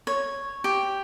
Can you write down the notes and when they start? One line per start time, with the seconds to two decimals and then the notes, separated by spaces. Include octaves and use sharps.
0.07 C#5
0.64 G4